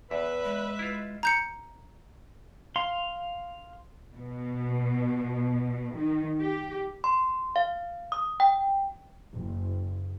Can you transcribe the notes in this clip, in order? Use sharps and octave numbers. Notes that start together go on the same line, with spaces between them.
E2 B4 E5
G#3
E4 F4
A#5 G6 C#7
F5 C6
B2
D#3
G4
C6
F5
D#6
G5
F#1